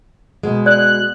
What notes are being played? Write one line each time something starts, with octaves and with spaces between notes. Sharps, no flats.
B2 G#3
D5 F#6